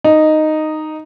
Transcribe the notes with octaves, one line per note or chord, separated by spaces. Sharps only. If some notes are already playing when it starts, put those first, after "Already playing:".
D#4